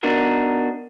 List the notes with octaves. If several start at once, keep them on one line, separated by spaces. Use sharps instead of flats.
B3 D4 D#4 F#4 A#4